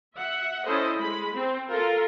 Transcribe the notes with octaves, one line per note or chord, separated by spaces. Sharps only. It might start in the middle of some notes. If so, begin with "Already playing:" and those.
E5 F#5
C#4 E4 A4 C5 D#5
G#3 B5
C4
F4 A4 A#4